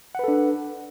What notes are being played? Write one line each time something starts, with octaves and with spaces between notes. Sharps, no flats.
D4 A4 B4 F#5